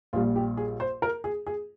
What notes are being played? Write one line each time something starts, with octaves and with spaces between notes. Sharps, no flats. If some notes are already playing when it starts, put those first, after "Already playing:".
A#1 A#2 G3 F4
G4
G#4
C5
A#4
G#4
G#4